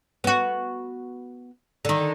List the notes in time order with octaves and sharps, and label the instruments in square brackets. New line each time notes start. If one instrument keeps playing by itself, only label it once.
[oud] B3 F#4
D3 D#3